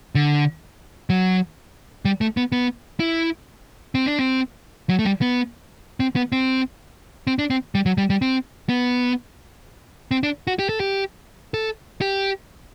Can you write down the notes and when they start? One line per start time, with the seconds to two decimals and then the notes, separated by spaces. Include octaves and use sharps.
0.15 D3
1.10 F#3
2.05 G3
2.21 A3
2.37 B3
2.52 B3
3.00 E4
3.95 C4
4.06 D4
4.19 C4
4.89 F#3
4.99 A3
5.05 G3
5.21 B3
6.00 C4
6.16 B3
6.32 C4
7.27 C4
7.39 D4
7.50 C4
7.75 G3
7.86 F#3
7.98 G3
8.10 G3
8.22 C4
8.69 B3
10.11 C4
10.23 D4
10.47 F#4
10.59 G4
10.69 A4
10.80 G4
11.54 A4
12.01 G4